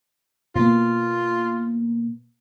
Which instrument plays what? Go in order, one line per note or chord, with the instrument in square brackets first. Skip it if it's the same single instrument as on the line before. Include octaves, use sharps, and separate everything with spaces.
[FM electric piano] B2 A#3 [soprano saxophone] F4